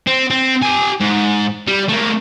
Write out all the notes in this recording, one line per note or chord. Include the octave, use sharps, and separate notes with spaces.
C4
C4
G4 G#5
G#2
G3
A3 A#3